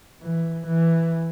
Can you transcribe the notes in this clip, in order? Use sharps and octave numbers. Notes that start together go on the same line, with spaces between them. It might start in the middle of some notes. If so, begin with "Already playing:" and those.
E3
E3